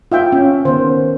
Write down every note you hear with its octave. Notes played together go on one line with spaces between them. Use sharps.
F4 E5 G5
C#4
D#3 B3 C5